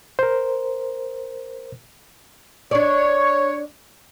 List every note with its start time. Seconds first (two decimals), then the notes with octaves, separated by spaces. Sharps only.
0.19 A#4 C5
2.71 D4 C#5 D5